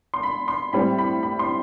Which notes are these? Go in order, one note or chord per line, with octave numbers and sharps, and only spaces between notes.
C6
B5
C6
A2 G3 C4 B5
B5
B5
C6